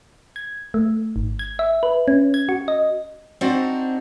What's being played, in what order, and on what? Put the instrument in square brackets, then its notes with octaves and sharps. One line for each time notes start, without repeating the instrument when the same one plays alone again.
[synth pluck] G#6
A3
G#1
G#6
E5
B4
C#4
G#6
F#4
D#5
[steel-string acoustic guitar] C4 D4 D#4 F#4 C5 D5